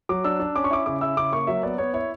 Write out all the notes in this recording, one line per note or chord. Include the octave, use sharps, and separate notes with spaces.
F#3 D6
D4 E6
D4
C#4 D6
C#6
E4 D6
C#3 D6
E4 E6
C#3 D6
A#3 C#6
F#3 E5
B3 D5
B3 C#5
E4 C#5